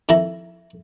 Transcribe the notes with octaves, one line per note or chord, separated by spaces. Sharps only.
F2 D#3 E4 A4 A#5